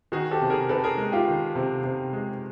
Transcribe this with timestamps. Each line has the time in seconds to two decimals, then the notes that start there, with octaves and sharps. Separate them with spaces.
0.12 D#3 F#4 G#4
0.31 G4 A4
0.41 C3
0.50 G#4 A#4
0.69 C3 A4 B4
0.84 G#4 A#4
0.98 G#3
1.12 F4 G4
1.27 D#3
1.55 C3
1.84 C3
2.13 G#3